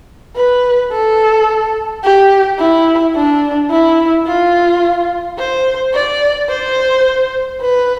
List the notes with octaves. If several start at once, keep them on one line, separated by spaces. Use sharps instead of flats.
B4
A4
G4
E4
D4
E4
F4
C5
D5
C5
B4